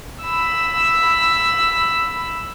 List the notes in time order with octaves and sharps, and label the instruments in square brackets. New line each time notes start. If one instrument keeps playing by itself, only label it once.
[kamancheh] B5 E6